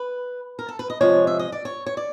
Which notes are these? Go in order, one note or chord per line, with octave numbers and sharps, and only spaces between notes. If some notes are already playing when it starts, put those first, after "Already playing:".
Already playing: B4
A#4
A4
B4
D#5
C3 F3 G#3 C#5
E5
D#5
D5
C#5
C#5
D5